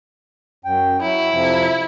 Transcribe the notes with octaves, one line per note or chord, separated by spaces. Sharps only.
F#2 G5
F#3 E4
F2 C3 F3